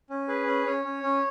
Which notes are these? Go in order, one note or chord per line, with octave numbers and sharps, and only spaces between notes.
C#4
G#4 B4
C#4
C#4 C#5
C#4
C#4